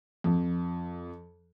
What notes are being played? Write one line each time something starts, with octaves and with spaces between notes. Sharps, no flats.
F2